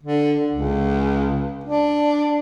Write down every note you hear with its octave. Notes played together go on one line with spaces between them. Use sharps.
D3
C#2
D4